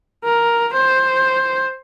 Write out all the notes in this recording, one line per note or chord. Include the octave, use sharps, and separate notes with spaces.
A#4
C5